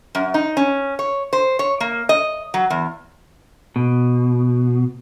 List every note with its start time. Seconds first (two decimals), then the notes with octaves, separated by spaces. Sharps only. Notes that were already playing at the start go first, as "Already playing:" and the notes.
0.15 F#2
0.34 D#4
0.57 C#4
0.99 C#5
1.33 C5
1.59 C#5
1.80 A#3
2.09 D#5
2.54 F#3
2.70 E2
3.76 B2